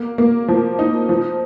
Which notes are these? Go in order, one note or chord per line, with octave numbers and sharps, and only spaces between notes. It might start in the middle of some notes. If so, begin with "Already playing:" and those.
Already playing: A#3
A#3
F3
D#4
F3